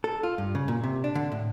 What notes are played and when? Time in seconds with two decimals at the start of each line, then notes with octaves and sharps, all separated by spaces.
0.04 A4
0.23 F4
0.38 G2
0.55 C#3
0.68 A#2
0.84 C3
1.04 D4
1.15 D3
1.32 A2